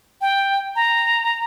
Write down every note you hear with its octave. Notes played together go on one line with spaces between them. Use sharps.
G5
A#5